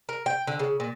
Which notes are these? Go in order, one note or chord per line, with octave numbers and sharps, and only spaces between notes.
A#4
G5
D3
C#3
A#2